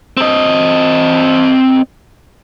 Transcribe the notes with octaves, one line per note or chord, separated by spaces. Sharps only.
C4 D#5